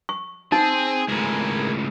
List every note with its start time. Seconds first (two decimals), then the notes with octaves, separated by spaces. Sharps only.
0.09 C#6
0.52 C4 D#4 G#4
1.09 C#2 A2 G#4 A#4